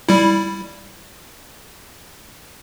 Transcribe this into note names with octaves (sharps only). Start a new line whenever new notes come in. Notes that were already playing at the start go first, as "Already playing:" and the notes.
G3 E4